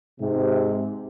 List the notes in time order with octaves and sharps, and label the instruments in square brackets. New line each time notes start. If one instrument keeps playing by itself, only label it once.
[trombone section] G#2 C3